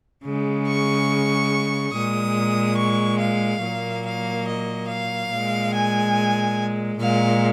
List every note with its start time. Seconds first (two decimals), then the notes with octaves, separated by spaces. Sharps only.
0.25 C#3 G#3
0.67 C#6
1.94 A#2 G#3 D#6
2.78 C#6
3.20 F5
3.62 A#2 F#3 A#3
4.05 F5
4.47 D#5
4.88 F5
5.32 A#2 G#3
5.74 G#5
6.99 A#2 G#3 F5